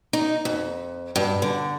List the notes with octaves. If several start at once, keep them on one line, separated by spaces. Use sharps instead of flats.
D#4
F2
G2
D3